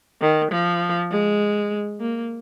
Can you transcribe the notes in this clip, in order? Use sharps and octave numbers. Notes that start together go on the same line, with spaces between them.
D#3
F3
G#3
A#3